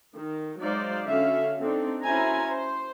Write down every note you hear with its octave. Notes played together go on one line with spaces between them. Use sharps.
D#3
F#3 G#3 D#4 C5 D5 F5
D3 C#4 F#4 E5 F5
C4 D4 D#4 A4
C#4 E4 F#4 C5 G#5 A#5
C5